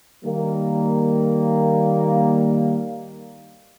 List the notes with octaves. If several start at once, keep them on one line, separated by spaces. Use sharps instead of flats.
D#3 G3 A#3